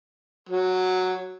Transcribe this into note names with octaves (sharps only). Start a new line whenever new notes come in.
F#3